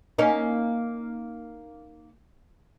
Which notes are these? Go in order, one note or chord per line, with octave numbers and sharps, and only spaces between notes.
A#3 C#4 D#4